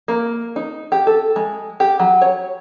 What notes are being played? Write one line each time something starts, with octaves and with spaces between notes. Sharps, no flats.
A#3
D#4
G4
A4
G#3
G4
F#3
C#5